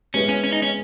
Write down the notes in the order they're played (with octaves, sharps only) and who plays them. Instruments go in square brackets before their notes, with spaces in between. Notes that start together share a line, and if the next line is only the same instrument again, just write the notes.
[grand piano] G#3 B3 E4 G#4 [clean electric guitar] C#4
[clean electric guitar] C#4
C#4
D#4
C#4